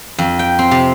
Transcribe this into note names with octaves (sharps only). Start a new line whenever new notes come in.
F2
G5
C4
C3